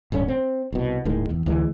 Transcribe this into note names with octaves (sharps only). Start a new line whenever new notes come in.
D1 G2 D3 C#4
C4
C2 B2
D#1 A2 D#3 G#3
E2
D2 E3 G#3